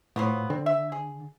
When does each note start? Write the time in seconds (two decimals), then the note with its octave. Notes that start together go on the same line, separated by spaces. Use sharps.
0.16 A2 F3 F#3 B3
0.50 D3 C4
0.66 E5
0.92 G#4